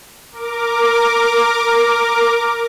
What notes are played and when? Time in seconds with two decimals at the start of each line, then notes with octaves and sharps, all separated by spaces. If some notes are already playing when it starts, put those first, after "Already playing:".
0.32 A#4 D6